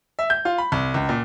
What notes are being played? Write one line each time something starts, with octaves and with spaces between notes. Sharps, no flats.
E5
G6
F4
B5
C2
C#2
A#2